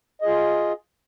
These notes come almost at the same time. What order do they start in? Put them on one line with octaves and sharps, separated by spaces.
D#5 G#4 F4